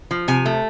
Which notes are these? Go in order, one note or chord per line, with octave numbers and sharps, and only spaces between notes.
F3
C3 G#5
A3